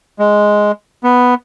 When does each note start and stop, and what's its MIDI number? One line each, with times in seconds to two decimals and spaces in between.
0.19 0.72 56
1.04 1.34 59